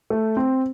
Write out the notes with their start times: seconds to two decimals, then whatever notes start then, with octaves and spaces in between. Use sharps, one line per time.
0.10 A3
0.37 C4